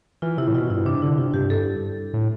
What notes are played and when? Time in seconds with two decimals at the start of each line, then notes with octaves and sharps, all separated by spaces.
0.22 E3 F4
0.38 C3 E4
0.48 A2
0.53 B2 F4
0.70 G2 E4
0.85 C3 D4
1.02 D3 E4
1.18 C3 F4
1.34 G2 G4
1.50 G2 A4
2.14 A2